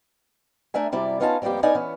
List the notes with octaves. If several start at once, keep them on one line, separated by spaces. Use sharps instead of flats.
A3 D4 A#4 E5 G#5
F#2 C3 G3 E4 D5
B3 C#4 D#4 F4 F#5 A5
F2 G3 A#3 B3 G4
B3 C#4 D#4 D5 G#5
E3 B3 C#4